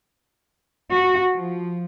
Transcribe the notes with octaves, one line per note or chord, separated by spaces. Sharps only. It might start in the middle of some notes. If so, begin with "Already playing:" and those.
F#4
F3